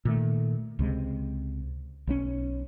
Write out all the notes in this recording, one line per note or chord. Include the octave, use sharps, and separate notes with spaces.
A#2 D#3 A3
C#2 C3 G#3
B1 G3 C#4